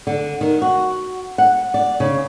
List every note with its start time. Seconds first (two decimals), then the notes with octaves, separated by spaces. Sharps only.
0.07 D3
0.41 D#3
0.62 F#4
1.38 F#5
1.74 D5
2.00 C#3